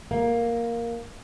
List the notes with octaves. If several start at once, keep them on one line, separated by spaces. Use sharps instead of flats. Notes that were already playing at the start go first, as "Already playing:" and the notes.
A#3